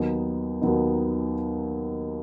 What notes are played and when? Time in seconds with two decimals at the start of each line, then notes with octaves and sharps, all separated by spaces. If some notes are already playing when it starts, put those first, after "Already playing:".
Already playing: D#2 D#3 F#3 B3 D#4
0.61 D#2 D#3 F#3 B3 D#4